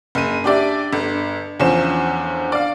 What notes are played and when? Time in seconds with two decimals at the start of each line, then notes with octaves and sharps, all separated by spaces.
0.15 F#1 D#7
0.44 D4 G4 D5 E5
0.93 G1
1.60 E2 D3 F3 C#4 C5 E7
2.52 D5 F5